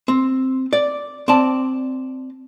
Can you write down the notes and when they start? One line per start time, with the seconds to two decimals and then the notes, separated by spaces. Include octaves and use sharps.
0.08 C4
0.73 D5
1.28 C4 D5 A5